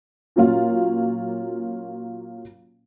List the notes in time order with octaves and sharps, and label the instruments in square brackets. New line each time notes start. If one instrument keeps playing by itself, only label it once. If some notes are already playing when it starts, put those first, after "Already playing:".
[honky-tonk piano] A#2 F#3 A#3 C#4 F4